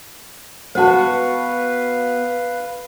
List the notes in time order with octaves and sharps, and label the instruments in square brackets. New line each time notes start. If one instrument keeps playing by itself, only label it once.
[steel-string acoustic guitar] B3 F#4 [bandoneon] B4 F5 [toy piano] C5 F#5 A5